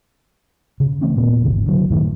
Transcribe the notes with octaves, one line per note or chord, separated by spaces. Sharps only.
C#3
E3 A3 C4 C#4
D#1 A#2 A#3 B3
G#1 D#2 C#3 E3
D3 F#3
F#2 A2 D#3 E3